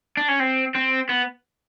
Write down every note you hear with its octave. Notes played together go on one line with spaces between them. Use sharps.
D4
C#4
C4
C4
B3